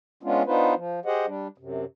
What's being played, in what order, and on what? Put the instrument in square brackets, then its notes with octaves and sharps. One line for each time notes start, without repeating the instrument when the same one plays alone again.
[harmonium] G#3 B3 C#4 D4 F4
B3 D4 D#4 F4 B4 C5
F3
G4 G#4 C5 D#5 F#5
G3 D4
F#2 C3